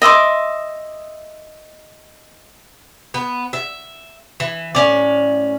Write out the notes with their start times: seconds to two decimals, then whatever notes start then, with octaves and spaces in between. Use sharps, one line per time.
0.02 D#5 E5 C6 D6
3.14 B3
3.53 E5
4.40 E3
4.75 A2 C#4 D5